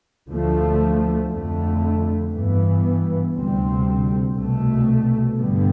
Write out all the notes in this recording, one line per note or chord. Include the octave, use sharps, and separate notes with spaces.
D2 D3 F3 A3
F2 D3 A3
G2 E3 B3
D2 C3 G3 C4
C2 B2 A3
G2 D3 G3 B3